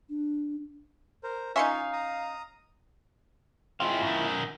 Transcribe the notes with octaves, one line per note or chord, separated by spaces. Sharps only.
D4
A#4 C5
C#4 D#4 F4 E5 F5 G#5 C6 C#7
A#5 D#6
G#3 C4 E4 F4 F5
F#2 D#3